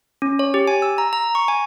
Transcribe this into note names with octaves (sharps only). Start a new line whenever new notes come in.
C#4
C#5
G4
G#5
E6
A#5
A#5
C#6
G#5